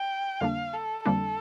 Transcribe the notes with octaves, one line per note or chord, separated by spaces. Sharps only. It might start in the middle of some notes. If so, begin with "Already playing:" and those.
Already playing: G5
F2 D3 G3 A#3 D4 F5
A4
F2 D3 G3 A#3 D4 A4